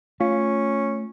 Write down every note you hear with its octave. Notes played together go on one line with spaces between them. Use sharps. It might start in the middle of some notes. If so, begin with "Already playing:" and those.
A3 C#4 F4